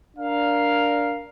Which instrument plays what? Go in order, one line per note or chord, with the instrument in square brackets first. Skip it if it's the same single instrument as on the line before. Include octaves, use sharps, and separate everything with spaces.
[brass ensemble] D4 A#4 F5